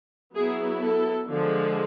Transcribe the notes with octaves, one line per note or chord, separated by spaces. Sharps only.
F#3 B3 E4 G#4
A4
D3 F3 G#3